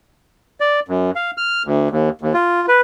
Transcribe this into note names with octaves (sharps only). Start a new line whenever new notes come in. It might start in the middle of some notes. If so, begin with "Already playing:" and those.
D5
F#2
F5
F6
D2
D#2
D#2
F4
B4